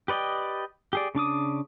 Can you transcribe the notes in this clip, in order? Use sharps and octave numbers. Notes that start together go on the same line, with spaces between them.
G4 B4 D5 D#5 G5
G4 G#4 D5
C#3 D4 D6 D#6